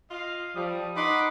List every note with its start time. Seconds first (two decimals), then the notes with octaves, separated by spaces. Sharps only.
0.11 F4 D#5 F5
0.56 F3 G3 D#6
0.97 D#4 B4 F#5 B5 C6 D6